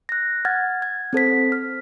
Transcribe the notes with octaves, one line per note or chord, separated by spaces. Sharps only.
F#6 A#6
F#5 F6 G#6 A6
G#6
C4 A4 C5 B6
F6